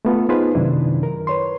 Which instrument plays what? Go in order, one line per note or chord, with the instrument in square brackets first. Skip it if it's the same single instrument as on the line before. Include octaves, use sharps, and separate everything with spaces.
[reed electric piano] A3 B3 F4 A4
B3 D#4 F4 G#4 B4 C5
F#2 C3 D#3 F#3 D4 E4
A#4
B4 C#5 C6